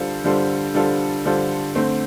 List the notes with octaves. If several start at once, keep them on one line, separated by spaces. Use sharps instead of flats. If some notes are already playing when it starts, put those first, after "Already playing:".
Already playing: D3 G3 F4 A4 C5
D3 G3 F4 A4 C5
D3 G3 F4 A4 C5
D3 G3 F4 A4 C5
D3 A3 C4